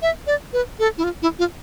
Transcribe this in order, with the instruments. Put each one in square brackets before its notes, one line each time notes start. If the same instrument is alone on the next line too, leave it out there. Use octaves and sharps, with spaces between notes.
[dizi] E5
D5
B4
A4
E4
F4
E4
F4